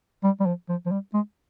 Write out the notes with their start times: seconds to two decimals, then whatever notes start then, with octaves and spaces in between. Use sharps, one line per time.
0.24 G3
0.40 G3
0.46 F3
0.69 F3
0.86 F3
0.91 G3
1.14 G#3